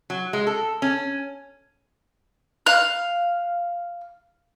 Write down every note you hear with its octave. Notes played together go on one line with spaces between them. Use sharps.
F#3
G#3
A4
C#4
F5 F#6